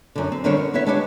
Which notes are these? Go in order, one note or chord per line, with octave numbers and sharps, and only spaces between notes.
F#2 D3
C4
D3 D#3 G3 C4 D4 C#5
A#4
B3 E4 C#5 E5
G#3 D4 G4 B4 C#5